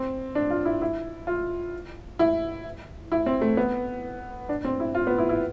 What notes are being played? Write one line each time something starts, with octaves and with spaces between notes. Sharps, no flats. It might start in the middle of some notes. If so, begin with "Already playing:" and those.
Already playing: C4
D4
F4
E4
E4
F4
E4
E4
C4
A3
B3
D4
C4
E4
F4
B3
E4
E4